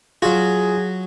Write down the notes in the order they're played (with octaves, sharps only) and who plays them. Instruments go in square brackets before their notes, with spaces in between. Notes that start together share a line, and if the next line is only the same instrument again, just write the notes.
[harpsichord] F#3 F#4 [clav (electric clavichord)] F4 [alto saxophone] G#4